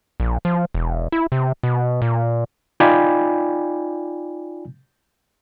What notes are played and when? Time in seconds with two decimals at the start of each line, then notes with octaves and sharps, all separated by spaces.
0.20 A#1
0.45 F3
0.75 E1
1.12 E4
1.32 C3
1.63 B2
2.02 A#2
2.80 D#4 F4 D5 G5 G#5 B5